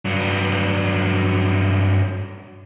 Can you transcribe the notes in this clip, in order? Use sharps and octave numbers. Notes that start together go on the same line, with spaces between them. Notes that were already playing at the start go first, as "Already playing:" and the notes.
G2 F#3